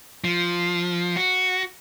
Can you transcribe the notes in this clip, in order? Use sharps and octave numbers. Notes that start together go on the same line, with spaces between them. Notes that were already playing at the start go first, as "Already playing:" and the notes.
F3
F#4